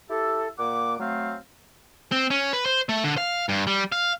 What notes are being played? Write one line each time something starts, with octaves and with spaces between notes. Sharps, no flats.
E4 G4 A4
A#2 A#3 F#5 D6
F#3 A3 C4 F5
C4
C#4
B4
C5
A3
D3
F5
G2
G3
F5